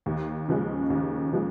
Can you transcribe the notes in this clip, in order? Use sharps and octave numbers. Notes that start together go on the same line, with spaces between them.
D#2
C#3 F3 G#3 C#4
D#2
C#3 F3 G#3